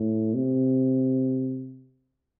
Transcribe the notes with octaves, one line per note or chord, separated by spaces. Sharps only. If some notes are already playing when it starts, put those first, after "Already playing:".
Already playing: A2
C3